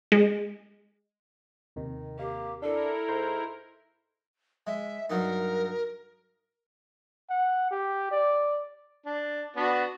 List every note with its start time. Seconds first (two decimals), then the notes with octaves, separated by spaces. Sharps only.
0.12 G#3
1.76 D#2 C3 D#3
2.19 A#3 G4
2.62 D4 E4 A4 A#4
3.08 G#2 A#5 C6 G6
4.67 G#3 E5
5.10 G2 F#3 D#4 A#4
7.30 F#5
7.71 G4
8.11 D5
9.06 D4
9.56 B3 D4 F#4